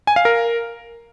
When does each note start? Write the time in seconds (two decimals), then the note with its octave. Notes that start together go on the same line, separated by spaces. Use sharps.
0.07 G#5
0.16 F5
0.25 A#4